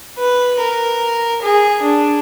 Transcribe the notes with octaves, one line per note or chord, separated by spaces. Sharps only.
B4
A#4
G#4
D4